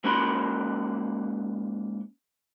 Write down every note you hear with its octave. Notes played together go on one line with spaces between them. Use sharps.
G#2 A#3 C#4 F#4 B5 C6